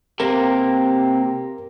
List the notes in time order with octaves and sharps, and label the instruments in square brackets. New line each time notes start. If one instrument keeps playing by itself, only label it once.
[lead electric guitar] C3 A#3 [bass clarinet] G4 [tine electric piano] A#4